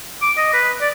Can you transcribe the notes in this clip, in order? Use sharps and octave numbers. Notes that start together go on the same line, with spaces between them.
D6
D#5
B4
D5